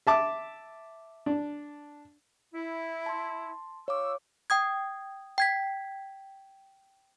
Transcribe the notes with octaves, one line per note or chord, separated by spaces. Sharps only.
E5 A5 D6
D4
E4
A5 C6
F4 C#5 C#6 D6 E6
G5 D#6 G#6
G5 G#6 B6